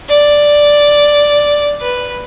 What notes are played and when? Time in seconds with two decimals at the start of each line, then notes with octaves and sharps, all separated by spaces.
0.09 D5
1.81 B4